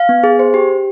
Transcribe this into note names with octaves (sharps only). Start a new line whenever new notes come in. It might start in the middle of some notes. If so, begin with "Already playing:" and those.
Already playing: F5
B3
G#4
C5
G4
G4